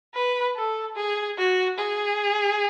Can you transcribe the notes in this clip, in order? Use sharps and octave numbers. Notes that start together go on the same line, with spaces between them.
B4
A4
G#4
F#4
G#4